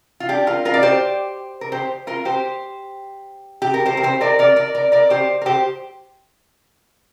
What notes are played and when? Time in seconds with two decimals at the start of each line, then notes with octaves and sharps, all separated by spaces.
0.20 F4
0.29 D4 G4
0.47 F4 A#4
0.65 F4 A#4
0.74 D5
0.83 G4 C5
1.61 A#4
1.72 G4 C5
2.07 F4 A#4
2.25 G4 C5
3.62 G4
3.74 A#4
3.86 G4 C5
3.97 A#4
4.03 G4 C5
4.21 A#4 D5
4.39 A#4 D5
4.56 A#4 D5
4.75 A#4 D5
4.92 A#4 D5
5.10 G4 C5
5.41 A#4
5.46 G4 C5